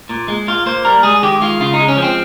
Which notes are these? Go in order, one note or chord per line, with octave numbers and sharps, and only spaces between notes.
A#2
G#3
A#2 F4
A#3 C5
G3 A#4
G#3 G#4
D#3 G4
G#3 F4
C#3 F4
D#4
G#3
C#4
F3
C4